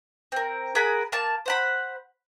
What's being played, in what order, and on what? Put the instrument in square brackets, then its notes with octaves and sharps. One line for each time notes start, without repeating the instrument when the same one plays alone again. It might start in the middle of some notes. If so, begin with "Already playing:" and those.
[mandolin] C4 A#4
G#4 A#4 F#5 B5
A#3 A5
C5 F#5 B5